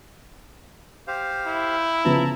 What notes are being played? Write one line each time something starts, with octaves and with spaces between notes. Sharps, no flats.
G4 C5 F5
E4
C#3 F3 B3 A5 A#5